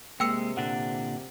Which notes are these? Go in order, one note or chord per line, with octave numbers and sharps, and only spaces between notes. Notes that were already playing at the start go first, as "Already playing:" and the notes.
C3 G#3 A#3 G5 E6 C#7
A#2 D3 D4 F#5